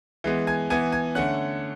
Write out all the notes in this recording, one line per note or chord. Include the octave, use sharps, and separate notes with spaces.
E3 G#3 B3
G#5 G#6
E3 B3 G#5 G#6
G#5 G#6
D3 A3 C#4 F#5 F#6